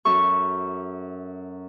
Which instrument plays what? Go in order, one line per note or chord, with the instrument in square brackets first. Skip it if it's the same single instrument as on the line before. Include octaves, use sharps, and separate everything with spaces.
[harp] F#2 A4 E5 C#6